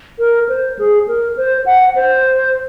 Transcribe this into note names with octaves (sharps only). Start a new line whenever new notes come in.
A#4
C5
G#4
A#4
C5
F#5
C5